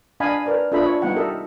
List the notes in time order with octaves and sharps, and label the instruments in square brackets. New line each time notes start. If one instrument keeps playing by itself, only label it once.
[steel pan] D4 D#5 F5 G#5 A5 B5
A#4 B4 D5
D4 F4 A4 D#5 E5 B5
C#5 A5
G3 B3 D#4 F#5 G5
G4 A4 A#4 D#5 E5